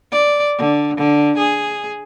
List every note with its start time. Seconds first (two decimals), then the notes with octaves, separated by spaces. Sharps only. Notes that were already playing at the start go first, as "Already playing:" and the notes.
0.12 D5
0.58 D3
0.97 D3
1.38 G#4